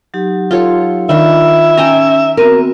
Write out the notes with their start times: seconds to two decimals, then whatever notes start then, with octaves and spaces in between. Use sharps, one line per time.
0.14 F#3 D#4 G4
0.51 F4 A4 C#5
1.09 D#3 D4 F4 E5 B5
1.77 C#4 G5 G#5 A#5
2.37 B3 C4 F#4 A#4